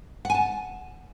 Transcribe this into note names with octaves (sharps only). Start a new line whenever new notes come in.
F#5 G#5 A5